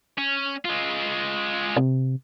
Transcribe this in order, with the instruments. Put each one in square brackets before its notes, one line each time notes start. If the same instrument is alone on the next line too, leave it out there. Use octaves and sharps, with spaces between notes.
[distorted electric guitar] C#4
G#3 F4
[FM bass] C3